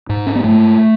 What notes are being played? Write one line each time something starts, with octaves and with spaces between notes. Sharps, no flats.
G#2
C#4
B3
G#2 A3